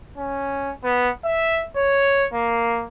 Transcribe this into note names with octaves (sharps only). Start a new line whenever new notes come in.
C#4
B3
E5
C#5
A#3